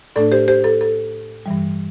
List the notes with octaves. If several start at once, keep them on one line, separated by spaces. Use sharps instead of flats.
A2 A3 D4 A4 D5
G4 C5
G4 C5
A4
A4
G2 E3 G3